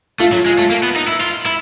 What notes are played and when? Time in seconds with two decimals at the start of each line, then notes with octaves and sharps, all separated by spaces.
0.20 A3 F4
0.33 F#3
0.46 G#3
0.58 A3
0.71 A#3
0.83 B3
0.96 D#4
1.08 E4
1.21 F4
1.46 E4